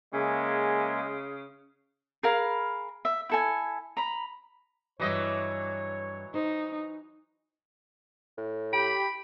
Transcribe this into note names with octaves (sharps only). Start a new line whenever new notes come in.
C#3 G#3 A#3 E5 G#5
G#4 A#4 F5 B5
E5
E4 A4 G#5
A#5 B5
G2 E3 F#3 G3 E4 C#5 D#5
D#4 C5
A2
G4 G5 B5 D7